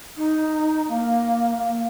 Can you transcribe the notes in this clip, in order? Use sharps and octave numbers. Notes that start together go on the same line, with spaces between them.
D#4
A#3
A#3